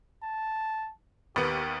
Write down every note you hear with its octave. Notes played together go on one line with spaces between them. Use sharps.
A5
D#2 B3 G4